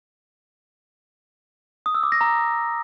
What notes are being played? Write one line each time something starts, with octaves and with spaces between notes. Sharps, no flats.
D#6
E6
D6
A#6
A#5